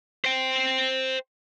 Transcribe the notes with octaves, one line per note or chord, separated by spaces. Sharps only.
C5 G5